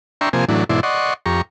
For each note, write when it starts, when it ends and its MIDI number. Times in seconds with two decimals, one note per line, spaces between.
0.21 0.29 62
0.21 0.29 76
0.21 0.29 79
0.21 0.29 82
0.21 0.29 84
0.21 0.29 85
0.33 0.45 48
0.33 0.45 53
0.33 0.45 58
0.33 0.45 72
0.33 0.45 80
0.49 0.64 45
0.49 0.64 52
0.49 0.64 54
0.49 0.64 62
0.69 0.80 44
0.69 0.80 47
0.69 0.80 52
0.69 0.80 64
0.69 0.80 74
0.69 0.80 84
0.83 1.14 74
0.83 1.14 75
0.83 1.14 78
0.83 1.14 84
0.83 1.14 85
1.26 1.42 41
1.26 1.42 67
1.26 1.42 82
1.26 1.42 85